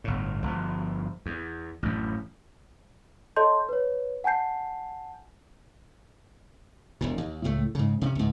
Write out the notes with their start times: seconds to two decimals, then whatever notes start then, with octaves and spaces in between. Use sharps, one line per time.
0.04 G1 A2
0.43 G1 F3
1.26 E2
1.83 A1 F#2
3.36 A4 C#5 D#5 A5 C6 G6
3.69 B4 C#5
4.24 F#5 G#5 A5 G6 C7
7.01 E1 E2 A#2
7.18 D#2
7.44 C#2 A2 A3
7.75 G#2 C#3
8.01 C3 B3 C#4
8.15 C#2 G#2